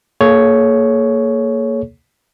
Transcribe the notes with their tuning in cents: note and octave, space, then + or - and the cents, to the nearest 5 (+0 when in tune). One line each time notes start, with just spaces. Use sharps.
A#3 -15 G#4 +40 C#5 +5